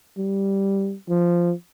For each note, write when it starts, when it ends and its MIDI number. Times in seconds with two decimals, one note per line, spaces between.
0.17 0.95 55
1.09 1.52 53